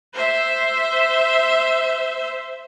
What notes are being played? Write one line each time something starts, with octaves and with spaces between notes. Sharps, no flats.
C5 E5